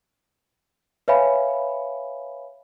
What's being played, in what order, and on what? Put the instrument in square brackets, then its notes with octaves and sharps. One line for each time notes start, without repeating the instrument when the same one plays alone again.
[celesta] B4 C#5 E5 F5 G#5 B5